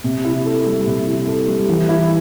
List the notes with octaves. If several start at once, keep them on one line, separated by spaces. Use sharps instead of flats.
C3
E4
A4
G3
C3
E4
A4
G3
E3
E4